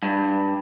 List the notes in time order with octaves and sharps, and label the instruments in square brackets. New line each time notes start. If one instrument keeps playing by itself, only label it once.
[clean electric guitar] G2